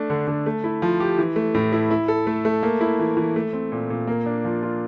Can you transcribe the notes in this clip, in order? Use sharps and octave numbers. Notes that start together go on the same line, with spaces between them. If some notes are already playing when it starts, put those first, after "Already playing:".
Already playing: A3 D4
D3
D3
A3
E4
F3
G4
E3
A3
A2
E4
E4
A4
A3
A3
A#3
E4
E3
E3
A3
C4
A#2
A#2
A#3
D4
F3
F4